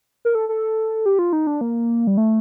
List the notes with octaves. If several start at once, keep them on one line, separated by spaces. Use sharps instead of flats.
A#4
A4
A4
G4
F4
D#4
D4
A#3
G3
A3